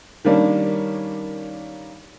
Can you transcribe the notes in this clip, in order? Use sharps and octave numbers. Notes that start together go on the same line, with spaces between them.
D#3 G3 A#3 C#4 D4